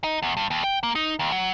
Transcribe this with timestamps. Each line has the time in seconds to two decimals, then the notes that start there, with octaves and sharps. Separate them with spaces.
0.04 D#4
0.22 E2
0.37 G2
0.51 D#2
0.64 G5
0.83 A#3
0.95 D#4
1.19 D#2
1.32 F#3